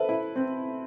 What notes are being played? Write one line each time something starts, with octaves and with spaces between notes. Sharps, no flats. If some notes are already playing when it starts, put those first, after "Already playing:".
Already playing: A4 B4 C5 E5
E4
C4